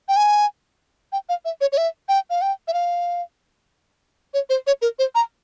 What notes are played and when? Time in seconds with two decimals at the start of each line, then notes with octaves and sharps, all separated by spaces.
0.08 G5
0.16 G#5
1.12 G5
1.29 F5
1.45 E5
1.61 C#5
1.72 C#5
1.77 E5
2.09 G5
2.30 F5
2.42 G5
2.68 E5
2.74 F5
4.34 C#5
4.50 C5
4.67 C#5
4.82 A#4
4.99 C5
5.15 A#5